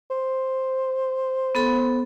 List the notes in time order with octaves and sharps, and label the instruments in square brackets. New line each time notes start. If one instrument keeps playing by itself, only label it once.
[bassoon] C5
[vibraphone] B3 A4 B5